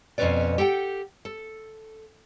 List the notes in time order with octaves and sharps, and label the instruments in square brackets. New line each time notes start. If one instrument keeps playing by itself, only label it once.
[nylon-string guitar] F2 B2 A#3 C#4 B4 D5
G4 A4 F#5 G5
A4